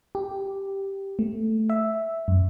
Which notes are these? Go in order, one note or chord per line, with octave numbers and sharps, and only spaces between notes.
G4
A3
E5
F#2